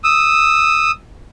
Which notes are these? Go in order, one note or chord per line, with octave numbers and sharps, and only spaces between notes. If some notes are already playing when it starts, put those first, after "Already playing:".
D#6 E6